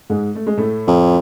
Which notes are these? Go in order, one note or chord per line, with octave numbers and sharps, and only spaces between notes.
G#2 G#3
A3
G#3
A2 A3
F2